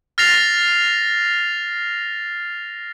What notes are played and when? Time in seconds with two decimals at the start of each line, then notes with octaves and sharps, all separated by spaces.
0.18 F6 A6 A#6 C7 F7